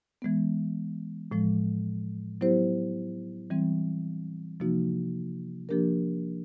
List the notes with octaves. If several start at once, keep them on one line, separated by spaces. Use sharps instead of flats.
E3 G#3 B3
A2 F3 G#3
F#3 B3 E4 G4 C5
E3 G3 C4
C3 F3 A#3 D#4 F#4
F3 A#3 D4 G4 A#4